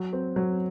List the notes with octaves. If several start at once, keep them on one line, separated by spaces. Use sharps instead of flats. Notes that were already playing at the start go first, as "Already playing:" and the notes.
Already playing: F#3
C4
F#3